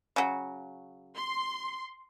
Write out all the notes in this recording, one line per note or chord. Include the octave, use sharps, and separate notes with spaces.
C#3 F#3
C6